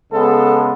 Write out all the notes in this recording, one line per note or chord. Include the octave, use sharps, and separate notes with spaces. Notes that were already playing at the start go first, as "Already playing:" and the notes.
C#3 G#3 B3 A4